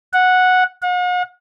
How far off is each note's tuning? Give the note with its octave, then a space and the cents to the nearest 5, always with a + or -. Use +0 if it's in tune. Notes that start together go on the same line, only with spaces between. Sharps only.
F#5 -10
F#5 -45